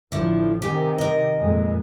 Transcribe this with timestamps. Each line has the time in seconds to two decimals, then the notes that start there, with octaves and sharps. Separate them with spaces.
0.12 A1 D3 F3 E4
0.62 C3 D#3 G4 G#5
0.98 A#4 D#5
1.39 F2 A#2 G#3